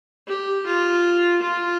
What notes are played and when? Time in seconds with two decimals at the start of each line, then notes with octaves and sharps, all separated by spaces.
0.27 G4
0.66 F4
1.41 F4